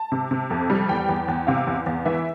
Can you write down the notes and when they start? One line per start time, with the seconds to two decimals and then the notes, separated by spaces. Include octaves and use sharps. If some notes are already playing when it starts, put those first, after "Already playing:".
Already playing: A5
0.12 C3
0.31 C3
0.50 F2
0.70 G3
0.89 E2 G5
1.09 E2
1.28 E2
1.47 C3 F5
1.67 E2
1.86 E2
2.05 E3 E5